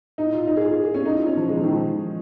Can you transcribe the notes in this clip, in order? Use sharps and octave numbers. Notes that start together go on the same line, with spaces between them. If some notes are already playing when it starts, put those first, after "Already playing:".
D#4
F4
D#4
G#4
F4
G#4
G#4
C#4
D#4
F4
C#4
F3
G#3
F3
D#3
F3